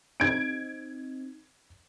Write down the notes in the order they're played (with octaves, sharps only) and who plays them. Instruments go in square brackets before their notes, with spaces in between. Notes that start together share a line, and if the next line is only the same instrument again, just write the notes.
[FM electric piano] C4 D#4 [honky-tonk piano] G#6 D7